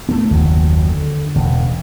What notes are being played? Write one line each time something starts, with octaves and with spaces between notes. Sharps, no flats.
A3 B3
F#1 D#2 F#3
D3
E1 C#3